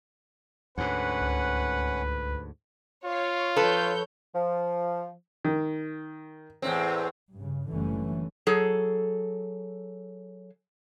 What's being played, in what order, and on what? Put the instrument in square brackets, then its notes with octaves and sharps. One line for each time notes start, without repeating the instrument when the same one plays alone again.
[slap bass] D2 G#2 [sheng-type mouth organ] C#4 F#5 [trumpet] B4
[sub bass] C#2
[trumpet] F4 [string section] C#5 F5
[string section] F3 C#5 G6 [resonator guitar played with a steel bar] A4 B4
[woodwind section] F3
[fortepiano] D#3
[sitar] E2 A2 C4
[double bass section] G2 C#3
F#1 D3 E3 G3 A3 C#4
[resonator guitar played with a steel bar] F#3 G#4 A4